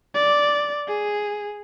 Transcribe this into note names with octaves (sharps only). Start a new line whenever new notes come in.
D5
G#4